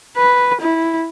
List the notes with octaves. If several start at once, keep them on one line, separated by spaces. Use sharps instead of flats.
B4
E4